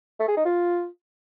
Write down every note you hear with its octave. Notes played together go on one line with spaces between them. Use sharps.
A3
G#4
D#4
F4